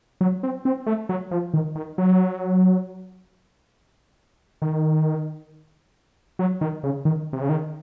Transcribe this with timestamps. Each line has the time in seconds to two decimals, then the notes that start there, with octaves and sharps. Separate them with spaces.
0.21 F#3
0.43 C4
0.65 C4
0.86 A3
1.09 F#3
1.31 F3
1.54 D#3
1.75 D#3
1.98 F#3
4.62 D#3
6.39 F#3
6.61 D#3
6.84 C#3
7.05 D#3
7.33 C3
7.41 C#3
7.49 D#3